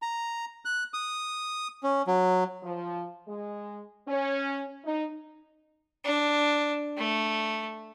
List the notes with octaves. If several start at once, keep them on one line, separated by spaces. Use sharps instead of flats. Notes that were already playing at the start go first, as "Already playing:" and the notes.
A#5
F#6
D#6
C#4
F#3
F3
G#3
C#4
D#4
D4
A3